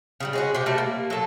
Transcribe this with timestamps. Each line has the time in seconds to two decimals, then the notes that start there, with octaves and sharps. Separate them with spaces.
0.20 C#3 F#3 G3
0.33 G#3 C#4 F#4
0.55 C3 G4
0.66 G3 A3 F#4 A#4
0.78 A#3
1.10 F#3 A4